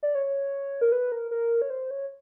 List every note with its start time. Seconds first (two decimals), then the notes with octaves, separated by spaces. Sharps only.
0.03 D5
0.15 C#5
0.81 A#4
0.92 B4
1.12 A#4
1.31 A#4
1.62 C#5
1.70 C5
1.91 C#5